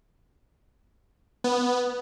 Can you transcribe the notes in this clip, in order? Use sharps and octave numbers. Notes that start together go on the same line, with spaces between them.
B3